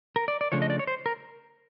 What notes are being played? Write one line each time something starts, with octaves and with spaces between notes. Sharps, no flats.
A#4
D5
D5
C#3 F3 A3 D4 C#5
D#5
D5
C#5
C5
A#4